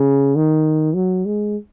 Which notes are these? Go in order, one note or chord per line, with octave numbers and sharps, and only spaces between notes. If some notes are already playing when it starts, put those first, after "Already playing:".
Already playing: C#3
D#3
F#3
G#3